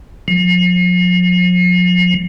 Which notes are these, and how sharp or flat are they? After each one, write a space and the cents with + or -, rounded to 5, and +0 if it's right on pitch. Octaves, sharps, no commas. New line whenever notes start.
F3 +45